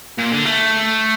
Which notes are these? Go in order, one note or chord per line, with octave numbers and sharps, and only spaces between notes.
A#2
D3
A3